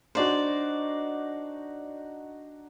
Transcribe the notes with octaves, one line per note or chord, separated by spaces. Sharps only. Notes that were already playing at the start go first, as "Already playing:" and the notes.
D4 D#4 F#4 C5 D5